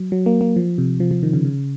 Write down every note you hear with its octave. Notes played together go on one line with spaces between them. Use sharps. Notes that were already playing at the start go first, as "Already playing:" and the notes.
Already playing: F#3
F#3
A#3
A#3
F3
C3
F3
F3
D#3
C#3
C#3